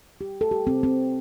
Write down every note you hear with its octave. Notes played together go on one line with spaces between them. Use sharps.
G4
A4
G4
C4
C4